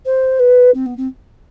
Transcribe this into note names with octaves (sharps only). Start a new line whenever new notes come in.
C5
B4
C4
B3
C4